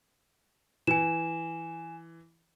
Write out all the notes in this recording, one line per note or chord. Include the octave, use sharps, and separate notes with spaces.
E3 G#5 E7